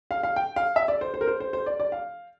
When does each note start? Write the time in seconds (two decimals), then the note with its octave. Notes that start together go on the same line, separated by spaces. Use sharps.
0.11 F5
0.23 F5
0.36 G5
0.56 F5
0.76 E5
0.88 D5
1.01 C5
1.14 C5
1.21 A#4
1.27 C5
1.40 C5
1.53 C5
1.66 D5
1.80 D5
1.92 F5